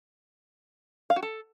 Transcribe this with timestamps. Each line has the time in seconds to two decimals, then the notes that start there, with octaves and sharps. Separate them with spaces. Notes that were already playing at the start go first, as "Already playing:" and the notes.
1.10 F5
1.16 F#4
1.23 A4